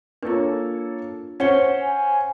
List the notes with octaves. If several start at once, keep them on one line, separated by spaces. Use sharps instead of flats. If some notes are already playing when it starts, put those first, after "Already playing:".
A#3 D4 F4 A4 C#5
C#4 C5 F#5 C#7 G7
G#5